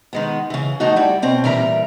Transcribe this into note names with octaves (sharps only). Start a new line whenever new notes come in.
D#3 G#3 B3
C#3 E3
F3 A3 D#4 F#4
G3 E4 D5
B2 C4 C#4
A#2 E3 G3 A#4 E5 A#5